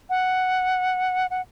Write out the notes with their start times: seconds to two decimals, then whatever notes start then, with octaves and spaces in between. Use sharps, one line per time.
0.09 F#5
1.30 F#5